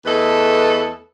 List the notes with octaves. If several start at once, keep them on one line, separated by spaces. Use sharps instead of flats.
E2 A3 A4 B4 D#5